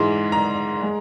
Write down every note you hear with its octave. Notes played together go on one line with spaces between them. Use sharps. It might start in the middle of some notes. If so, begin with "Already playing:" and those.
Already playing: G#2 E3 G#3
A#5
G#3